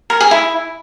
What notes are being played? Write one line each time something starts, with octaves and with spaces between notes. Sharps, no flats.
A#4
G#4
E4